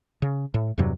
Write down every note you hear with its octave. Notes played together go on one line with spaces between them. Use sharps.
C#3
A2
E2 G2 C3 F#3